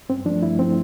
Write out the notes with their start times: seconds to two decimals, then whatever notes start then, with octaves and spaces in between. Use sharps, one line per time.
0.09 G2 C4
0.25 F3 D4
0.30 A3
0.42 G2 E4
0.59 F3 A3 C4